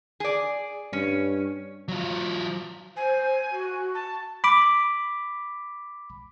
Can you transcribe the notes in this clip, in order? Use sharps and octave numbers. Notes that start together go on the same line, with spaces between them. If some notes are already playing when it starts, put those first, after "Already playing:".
G#4 D5
G2 C#4
F#3 F4
C5 G#5
F#4
A5
B5 D6